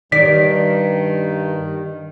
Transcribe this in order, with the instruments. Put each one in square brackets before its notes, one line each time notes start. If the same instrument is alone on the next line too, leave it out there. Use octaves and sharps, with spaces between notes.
[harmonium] G2 [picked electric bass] D#3 [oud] D5 [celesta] B6